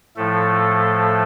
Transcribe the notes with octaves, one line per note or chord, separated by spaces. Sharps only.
A2 F3 A3 A4